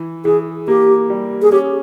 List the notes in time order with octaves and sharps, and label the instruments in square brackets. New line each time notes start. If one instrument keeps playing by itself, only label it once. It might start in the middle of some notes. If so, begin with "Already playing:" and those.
Already playing: [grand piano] E3
[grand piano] E3 [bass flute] G#4
[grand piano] A#3 [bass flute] G4
[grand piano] G3
[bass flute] G#4
[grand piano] C#4 [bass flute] G4